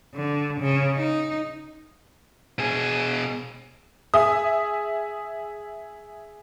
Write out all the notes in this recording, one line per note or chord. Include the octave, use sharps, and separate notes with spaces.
D3
C#3
D#4
B2 G#4
G#4 E5 D#6